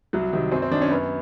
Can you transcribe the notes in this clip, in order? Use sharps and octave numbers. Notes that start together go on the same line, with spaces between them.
C2 F#3
C3 D#3
F#2 C4
C4
D#3 D4
C#4
F#2 B3